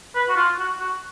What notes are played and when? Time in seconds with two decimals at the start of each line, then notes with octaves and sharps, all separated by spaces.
0.15 B4
0.29 F#4
0.36 F4
0.59 F#4
0.80 F#4